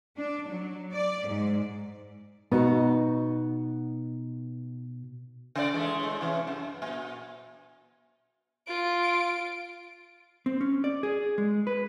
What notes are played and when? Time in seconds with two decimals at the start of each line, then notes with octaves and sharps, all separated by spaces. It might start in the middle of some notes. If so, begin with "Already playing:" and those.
0.17 D4
0.49 F#3
0.93 D5
1.26 G#2
2.52 B2 B3 D#4 F#4
5.55 C#3 D5
5.73 E3 G#3 A3
6.00 A2 G#3
6.21 C3 E3 C#4
6.47 F#2
6.82 A#2
8.67 F4 D7
10.46 C4
10.61 C#4
10.84 D5
11.03 G#4
11.38 G#3
11.67 B4